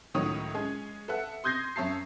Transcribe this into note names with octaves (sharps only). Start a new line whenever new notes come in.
C#2 A2 D#3 F#3 C#5 D#6
G#3 C#4 G#4
A4 B4 E5 F#5
C6 D#6 G6 G#6 A#6 C7
F#2 C#5 E5 A5 C7